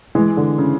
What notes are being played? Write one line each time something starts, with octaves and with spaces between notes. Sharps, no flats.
E3 G#3
D3
C#3